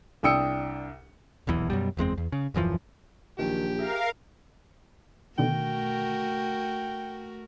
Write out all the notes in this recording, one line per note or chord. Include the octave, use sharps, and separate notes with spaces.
C2 D4 G5 D#6 E6 C#7
D#1 B1 E2 E3
F#2 B2 G3
F#1 E2 G#3 C4
E2
C#3
D#1 F#2 E3 F3
A#1 D#3 F#3 G4
G#4 A#4 E5 F5
B2 D3 D#3 A3 F#4 A#4 G5